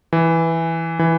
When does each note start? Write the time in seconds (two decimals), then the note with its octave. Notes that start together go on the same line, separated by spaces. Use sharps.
0.13 E3
0.99 E3